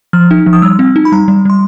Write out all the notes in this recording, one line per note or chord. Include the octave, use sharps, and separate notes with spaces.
F3 F6
D#4
F3
D#6
G3 E6
C4
D#4
B5
G3 A#5
G3
G3 C6